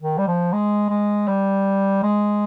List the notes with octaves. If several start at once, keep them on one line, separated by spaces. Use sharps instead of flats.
D#3
G3
F3
G#3
G#3
G3
G#3